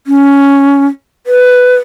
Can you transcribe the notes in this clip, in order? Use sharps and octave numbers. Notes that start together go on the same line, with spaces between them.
C#4
B4